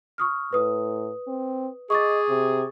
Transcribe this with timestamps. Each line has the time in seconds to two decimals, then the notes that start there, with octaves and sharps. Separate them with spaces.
0.18 C#6 D#6 F6
0.53 A2 B4 D#6
1.28 C4
1.90 G#4 D#5 C#6 D6 A6
2.29 C3